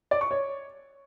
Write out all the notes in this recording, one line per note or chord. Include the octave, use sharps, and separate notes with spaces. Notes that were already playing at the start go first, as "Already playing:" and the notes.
D5
C#6
C#5